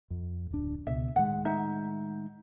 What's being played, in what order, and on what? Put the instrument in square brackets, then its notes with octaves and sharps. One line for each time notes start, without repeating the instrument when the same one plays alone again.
[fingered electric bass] F2
D1 D4
[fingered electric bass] C#2 B2 [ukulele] E5
[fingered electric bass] A2 D#3 G#3 [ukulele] F#5
[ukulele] D#4 E5